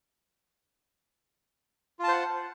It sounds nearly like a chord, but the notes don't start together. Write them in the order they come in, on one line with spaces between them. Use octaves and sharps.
F4 A5 C5 F#5